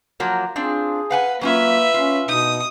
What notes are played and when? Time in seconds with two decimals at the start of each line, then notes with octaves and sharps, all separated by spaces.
0.20 F3 F#3 A#3
0.56 C4 D4 F4 G#4
1.11 B4 F5 F#5 G#5
1.41 F#3 A#3 C#4 F4 B4 E5
1.94 C#4 F4
2.29 B2 D#4 D#6